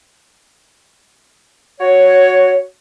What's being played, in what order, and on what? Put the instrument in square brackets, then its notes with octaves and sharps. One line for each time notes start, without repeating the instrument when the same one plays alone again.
[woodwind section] F#4 C#5